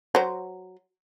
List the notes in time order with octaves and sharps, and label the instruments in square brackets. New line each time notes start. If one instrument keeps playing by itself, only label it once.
[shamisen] F#3 C5